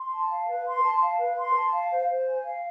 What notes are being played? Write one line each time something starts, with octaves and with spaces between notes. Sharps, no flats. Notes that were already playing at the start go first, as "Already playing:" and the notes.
Already playing: C6
A5
F5
B4
C6
A5
F5
B4
C6
A5
F5
C5
C5
G#5
F5